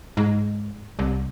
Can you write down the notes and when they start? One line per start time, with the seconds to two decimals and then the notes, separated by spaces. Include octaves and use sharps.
0.17 G#2
0.99 C2